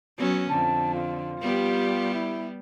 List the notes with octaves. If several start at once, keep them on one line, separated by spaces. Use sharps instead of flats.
F#3 B3 C#4
F2 D3 A5
F4
G3 B3 G4
E4